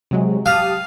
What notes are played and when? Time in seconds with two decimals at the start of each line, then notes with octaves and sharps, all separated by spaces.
0.11 C3 F#3 G#3
0.46 G4 F5 A5 D#6